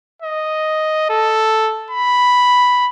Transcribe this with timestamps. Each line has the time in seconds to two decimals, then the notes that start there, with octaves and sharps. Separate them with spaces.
0.22 D#5
1.10 A4
1.90 B5